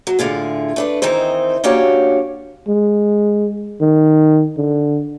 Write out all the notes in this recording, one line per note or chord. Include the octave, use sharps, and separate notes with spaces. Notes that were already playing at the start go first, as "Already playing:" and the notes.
F#3
A2 D3 F4 G#4
A3 D4 B4
D#3 E3 C4 D#4 C5
A#3 C#4 D4 F#4 G4 C#5
G#3
D#3
D3